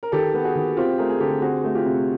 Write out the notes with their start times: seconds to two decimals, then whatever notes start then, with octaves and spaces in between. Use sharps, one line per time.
0.03 A#4
0.12 D#3 G4 A4
0.34 B3
0.44 F#4 G#4
0.55 D#3
0.77 C4 F4 G4
0.98 A3 G#4 A#4
1.10 G#4
1.20 D3 G4 A4
1.42 C4 F#4 G#4
1.64 A3
1.75 F4 G4
1.86 C3